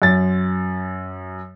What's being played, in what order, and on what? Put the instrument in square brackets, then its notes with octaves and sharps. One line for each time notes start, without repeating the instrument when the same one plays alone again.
[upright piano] F#2 A6